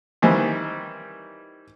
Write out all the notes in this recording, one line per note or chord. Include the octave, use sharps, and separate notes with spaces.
D#3 E3 G3 C4